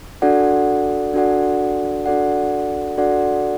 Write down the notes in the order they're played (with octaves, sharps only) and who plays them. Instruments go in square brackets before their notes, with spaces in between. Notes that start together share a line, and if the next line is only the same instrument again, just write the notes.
[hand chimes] D4 F#4 A4 D5 F#5
D4 F#4 A4 D5 F#5
D4 F#4 A4 D5 F#5
D4 F#4 A4 D5 F#5